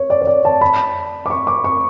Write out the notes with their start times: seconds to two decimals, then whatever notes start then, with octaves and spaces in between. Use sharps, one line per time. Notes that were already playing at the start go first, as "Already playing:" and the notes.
Already playing: C#5
0.10 D5
0.22 C#5
0.27 D5
0.45 A5
0.61 B5
1.26 D6
1.30 C#6
1.47 D6
1.64 C#6